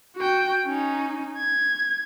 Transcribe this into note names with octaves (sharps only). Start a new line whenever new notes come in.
F#4 G5
C#4 D#4
G#6